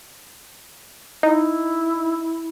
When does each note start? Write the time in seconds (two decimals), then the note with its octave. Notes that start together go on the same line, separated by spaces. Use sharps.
1.23 D#4 E4